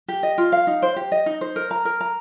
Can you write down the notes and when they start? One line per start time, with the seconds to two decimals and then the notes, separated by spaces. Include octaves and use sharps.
0.08 G4
0.23 D#5
0.38 F4
0.52 F5
0.67 D#4
0.82 C5
0.96 G4
1.12 D#5
1.26 D#4
1.41 C5
1.56 A#4
1.71 A#5
1.85 A#4
2.01 A#5